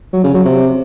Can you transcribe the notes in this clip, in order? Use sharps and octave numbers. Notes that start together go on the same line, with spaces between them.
F#3
C#3
F#3
C3